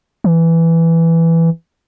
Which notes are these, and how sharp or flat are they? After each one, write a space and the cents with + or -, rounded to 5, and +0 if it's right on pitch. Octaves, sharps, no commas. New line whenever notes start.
E3 +5